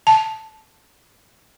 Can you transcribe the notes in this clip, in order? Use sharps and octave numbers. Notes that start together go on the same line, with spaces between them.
A5